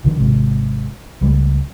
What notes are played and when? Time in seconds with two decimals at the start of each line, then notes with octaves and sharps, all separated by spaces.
0.04 B1 D3 D#3 F3
0.19 G#1 G#2 C3
1.21 C#2 G3 A3